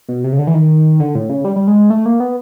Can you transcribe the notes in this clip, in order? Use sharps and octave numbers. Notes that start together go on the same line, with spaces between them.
B2
C3
C#3
D3
E3
D#3
D3
A2
C#3
G3
G3
G#3
A3
A#3
B3